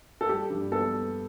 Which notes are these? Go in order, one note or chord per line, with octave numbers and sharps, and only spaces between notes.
A4
G3 G4
G2
B3 A4